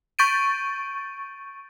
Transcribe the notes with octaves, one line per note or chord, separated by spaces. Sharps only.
C#6 G6 A6 D7 D#7